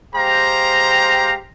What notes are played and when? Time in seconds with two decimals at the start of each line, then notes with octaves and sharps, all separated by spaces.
0.15 G#3 G4 C5 F5 G5 A#5